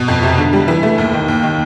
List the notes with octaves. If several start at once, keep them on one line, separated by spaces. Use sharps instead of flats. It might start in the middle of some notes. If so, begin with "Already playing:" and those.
Already playing: B2
F2
C3
D3
G3
E3
A3
D#2
D#3
D#2
D#3